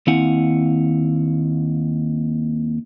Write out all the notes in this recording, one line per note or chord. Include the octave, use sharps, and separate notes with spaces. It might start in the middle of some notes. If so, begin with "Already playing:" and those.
D#2 C4 E4 F5 F#5 G#5